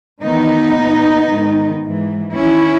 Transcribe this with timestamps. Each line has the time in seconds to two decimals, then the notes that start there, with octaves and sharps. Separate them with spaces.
0.22 E2 D#3 B3 D#4
0.75 A#2
1.29 G#2 D#3
1.82 G#2 E3
2.35 E2 D#3 C#4 E4